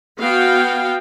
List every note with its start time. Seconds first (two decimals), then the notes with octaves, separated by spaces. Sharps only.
0.19 B3 F#4 F5 G5